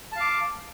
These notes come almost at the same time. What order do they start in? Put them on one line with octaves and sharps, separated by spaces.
A5 F5 D6